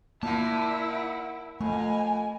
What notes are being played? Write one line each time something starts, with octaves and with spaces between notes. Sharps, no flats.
A#2 A#3 E4 F#5 A5
F2 A3 G#5